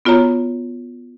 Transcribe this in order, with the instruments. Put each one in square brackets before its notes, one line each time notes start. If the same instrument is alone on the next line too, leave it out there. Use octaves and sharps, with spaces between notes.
[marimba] B3 F4 F#4 C#5 A#5